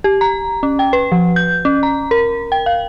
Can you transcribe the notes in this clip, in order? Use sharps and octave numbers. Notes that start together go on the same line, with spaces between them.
G4
A#5
C#4
G5
B4
F3
G6
C#4
A#5
A#4
G5
F5